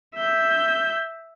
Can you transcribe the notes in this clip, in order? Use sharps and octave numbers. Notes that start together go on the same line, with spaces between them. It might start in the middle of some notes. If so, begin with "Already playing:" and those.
E5 G6